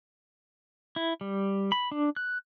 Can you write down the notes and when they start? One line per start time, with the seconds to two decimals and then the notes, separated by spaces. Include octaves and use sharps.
0.96 E4
1.21 G3
1.72 B5
1.92 D4
2.16 F#6